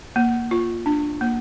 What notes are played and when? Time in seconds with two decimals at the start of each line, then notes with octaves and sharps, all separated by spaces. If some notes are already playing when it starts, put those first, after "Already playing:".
0.16 A#3
0.51 F4
0.86 D4
1.21 A#3